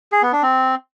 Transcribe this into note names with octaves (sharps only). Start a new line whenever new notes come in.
G#4
B3
D4
C4